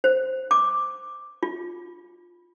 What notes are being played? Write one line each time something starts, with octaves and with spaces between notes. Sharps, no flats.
C5
D6
F4